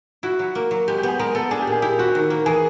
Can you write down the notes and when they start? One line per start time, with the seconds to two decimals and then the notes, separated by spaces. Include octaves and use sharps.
0.23 E4 F#4
0.39 F#3
0.55 A#3
0.71 F#3
0.88 G#3 G4
0.98 G4
1.03 B3
1.08 G#4
1.19 G#3 A#4
1.35 B3 A4
1.51 D4 G#4
1.62 G4
1.67 A#2 G#4
1.82 E4 G4
1.99 C4 F#4
2.15 D#3
2.30 A#3
2.46 E3 G#4